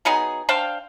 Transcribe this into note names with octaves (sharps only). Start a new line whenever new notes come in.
F#3 B3 D#4 G#4
D4 C5 F5 G5